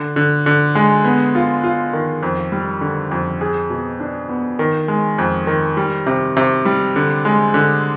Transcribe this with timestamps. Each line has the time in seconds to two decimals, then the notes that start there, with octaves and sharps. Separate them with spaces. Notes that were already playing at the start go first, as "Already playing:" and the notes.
Already playing: D3
0.16 D3
0.46 D3
0.75 G#3
1.04 B3
1.35 F4
1.63 F4
1.93 D#3
2.23 F2
2.52 G3
2.81 D3
3.11 F2
3.41 G#4
3.70 B2
4.00 D4
4.29 B3
4.59 D#3
4.88 G#3
5.18 F2
5.47 D#3
5.77 G3
6.06 C3
6.37 C3
6.65 G3
6.96 D3
7.25 G#3
7.54 D3